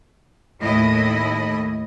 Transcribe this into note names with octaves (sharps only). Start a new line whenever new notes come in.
D#2 A2 E4 D#5